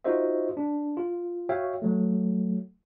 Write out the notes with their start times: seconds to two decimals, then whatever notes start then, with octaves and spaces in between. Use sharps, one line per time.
0.04 D#4 F4 F#4 C5 D#5 E5
0.57 D4
0.97 F4
1.49 F#4 C#5 E5 F5 G5
1.82 F#3 A3